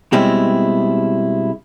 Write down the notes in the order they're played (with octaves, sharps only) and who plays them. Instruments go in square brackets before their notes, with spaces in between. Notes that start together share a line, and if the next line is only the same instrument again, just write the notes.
[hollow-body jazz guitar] B2 G3 G#3 C4 E4